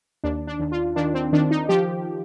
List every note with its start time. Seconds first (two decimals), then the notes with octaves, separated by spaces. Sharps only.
0.24 D#2 D4
0.47 D4
0.60 D#2
0.72 F4
0.96 D#3 D4
1.14 C4
1.33 D#3 D4
1.51 D#4
1.69 F3 G4